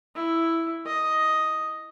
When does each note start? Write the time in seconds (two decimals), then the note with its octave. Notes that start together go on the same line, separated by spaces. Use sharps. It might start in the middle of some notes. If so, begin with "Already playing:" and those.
0.15 E4
0.86 D#5